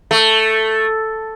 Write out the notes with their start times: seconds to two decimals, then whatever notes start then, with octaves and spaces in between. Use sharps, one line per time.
0.11 A3